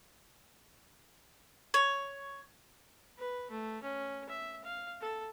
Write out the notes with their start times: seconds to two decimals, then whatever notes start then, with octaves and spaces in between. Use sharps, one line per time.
1.74 C#5
3.18 B4
3.50 A3
3.82 C#4
4.29 E5
4.64 F5
5.01 A4